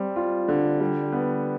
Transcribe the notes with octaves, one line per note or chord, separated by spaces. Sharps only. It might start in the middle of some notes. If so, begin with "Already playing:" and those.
Already playing: G3 C4
F4
D3
G3
B3